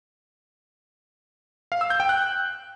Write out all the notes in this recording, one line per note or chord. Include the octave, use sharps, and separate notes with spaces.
F5
E6
G6
G5
F#6